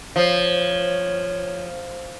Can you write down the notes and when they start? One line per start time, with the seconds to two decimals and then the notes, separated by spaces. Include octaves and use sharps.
0.16 F3 C#5